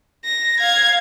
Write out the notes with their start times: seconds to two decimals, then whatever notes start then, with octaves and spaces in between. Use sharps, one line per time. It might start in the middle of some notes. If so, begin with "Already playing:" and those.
0.25 A#6
0.60 F5 G#6